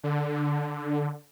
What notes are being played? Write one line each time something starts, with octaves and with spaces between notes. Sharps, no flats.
D3